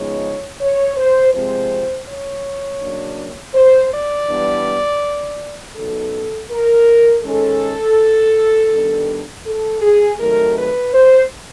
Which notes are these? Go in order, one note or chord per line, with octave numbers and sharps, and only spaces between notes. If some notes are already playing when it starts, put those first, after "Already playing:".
Already playing: C#3 F3 G#3 B3 D#4 C#5
C#5
C5
C3 F3 G#3 C4 C5
C#5
C#3 F#3 A#3 D4
C5
D5
E3 G3 B3 D4
C#3 F#3 B3 D#4 A4
A#4
D#3 G#3 C#4 A4
D#3 G3 B3 D4
A4
G#4
C3 D#3 F#3 A3 A#4
B4
C5